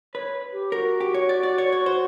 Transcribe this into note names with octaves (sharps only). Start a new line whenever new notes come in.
B4 C#5
G4
F#4 A#4
G4
C#5
D5
D5
C#5
C#5
C5